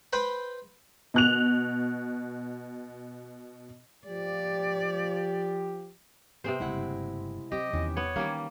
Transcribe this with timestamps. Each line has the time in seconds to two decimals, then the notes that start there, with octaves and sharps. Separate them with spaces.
0.13 B4 C5 G5 B5
1.14 B2 F#6 F7
4.07 F3 G4 D5
6.44 C3 B3 C4 G#4 C5
6.60 F#1 G2 G#3 E4 F#5
7.52 F#3 C4 G4 D#5
7.73 E2 D#3 E3 C#4
7.97 B3 C#5
8.16 D#3 E3 G3 A#3 C#4 G4